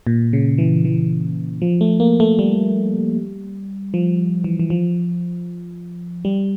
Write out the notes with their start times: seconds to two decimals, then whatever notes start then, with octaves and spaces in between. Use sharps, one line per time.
0.07 A#2
0.33 C#3
0.58 E3
0.85 E3
1.62 F3
1.81 A3
2.00 A#3
2.20 A3
2.39 G3
3.94 F3
4.44 E3
4.60 E3
4.70 F3
6.25 G3